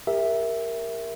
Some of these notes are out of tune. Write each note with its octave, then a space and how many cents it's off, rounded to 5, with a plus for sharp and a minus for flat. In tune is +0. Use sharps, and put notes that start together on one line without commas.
G4 +40 A#4 +0 E5 +0